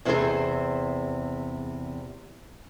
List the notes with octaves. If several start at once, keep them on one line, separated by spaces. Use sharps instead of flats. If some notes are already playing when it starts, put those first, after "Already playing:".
E2 C3 C4 E4 G#4 C5